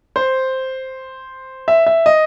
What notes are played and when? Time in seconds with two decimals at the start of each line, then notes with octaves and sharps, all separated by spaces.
0.16 C5
1.68 E5
1.86 E5
2.06 D#5